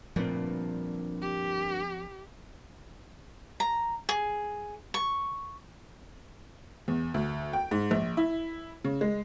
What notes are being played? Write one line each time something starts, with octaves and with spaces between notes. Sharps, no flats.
D2 G2 A#2 F3 C4
G4
A#5
G#4
C#6
E2
D2
G5
G#2
A#1
E4
C#3
G#3